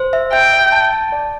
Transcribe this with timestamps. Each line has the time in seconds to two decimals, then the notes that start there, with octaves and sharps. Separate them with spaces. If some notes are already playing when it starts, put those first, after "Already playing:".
Already playing: C5
0.13 E5
0.33 E5 G5
0.53 E5
0.72 A5
0.93 A5
1.12 D5